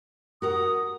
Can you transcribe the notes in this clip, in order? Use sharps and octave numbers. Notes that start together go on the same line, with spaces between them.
F#4 A#4 F#5 D#6